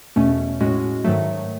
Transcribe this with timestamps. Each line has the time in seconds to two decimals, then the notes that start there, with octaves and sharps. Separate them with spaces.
0.16 E2 B2 A3 C#4
0.60 A2 G#3 C#4 F#4
1.04 G#2 D#3 F#3 A3